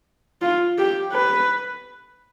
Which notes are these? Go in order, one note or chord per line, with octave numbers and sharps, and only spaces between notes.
F4
G4
B4